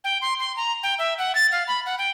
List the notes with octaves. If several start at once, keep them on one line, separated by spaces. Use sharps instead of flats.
G5
C6
C6
A#5
G5
E5
F#5
A6
F5
B5
F#5
G5